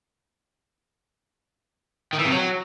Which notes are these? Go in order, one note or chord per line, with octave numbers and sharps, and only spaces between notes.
D#3
E3
C3
F#3